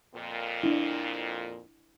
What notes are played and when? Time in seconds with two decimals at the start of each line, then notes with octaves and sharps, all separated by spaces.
0.15 F2 A#2
0.63 D4 E4